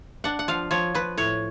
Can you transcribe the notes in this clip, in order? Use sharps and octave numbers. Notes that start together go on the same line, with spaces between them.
D4 F#5
F#5
F3 F5
F3 C#5
F3 B4
A2 C#5